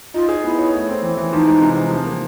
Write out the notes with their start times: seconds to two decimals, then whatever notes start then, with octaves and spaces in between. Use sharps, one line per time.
0.14 D#4 F4
0.29 G#4
0.43 B3 E4
0.58 C#5
0.74 A3
0.89 C4
1.03 E3
1.17 E3
1.33 F3 D#4
1.47 G#3
1.61 C3
1.77 C3
1.91 F3
2.06 A#3